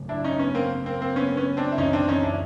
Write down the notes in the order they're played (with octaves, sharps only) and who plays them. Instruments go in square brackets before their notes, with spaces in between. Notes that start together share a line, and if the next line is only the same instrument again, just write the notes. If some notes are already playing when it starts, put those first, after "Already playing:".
Already playing: [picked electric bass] C#3 F#3 A3
[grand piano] D4 E4
C#4 D#4
B3 C#4
A#3 C4
A#3 C4
A#3 C4
B3 C#4
B3 C#4
C4 D4
E4
[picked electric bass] F#2 C#3 E3 A3 [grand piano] C#4 D#4
[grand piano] C4 D4
C#4 D#4
D4 E4